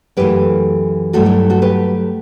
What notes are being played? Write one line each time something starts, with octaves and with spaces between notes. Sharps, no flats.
F#2 E3 A3 G4 B4
G2 F#3 A3 F#4 A4
E4 G4
F#4 A4
G4 B4